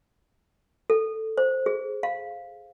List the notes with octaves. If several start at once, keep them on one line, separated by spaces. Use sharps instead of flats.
A4
C5
G#4
F5